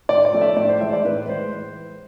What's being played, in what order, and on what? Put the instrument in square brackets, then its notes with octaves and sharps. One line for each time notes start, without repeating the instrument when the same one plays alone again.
[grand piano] A2 D5
D5
F3 A3
E5
A2 D5
C5
E3 G#3 E5
D5
A2 B4
E3 G#3 C5